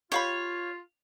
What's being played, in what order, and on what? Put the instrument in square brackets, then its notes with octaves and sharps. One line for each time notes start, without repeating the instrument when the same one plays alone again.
[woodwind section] F4 [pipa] G4 F5 B5 [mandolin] C#5